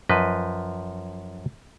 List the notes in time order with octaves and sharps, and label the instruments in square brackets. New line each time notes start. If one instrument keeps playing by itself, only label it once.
[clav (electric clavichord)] F#2 F3 B4 D#5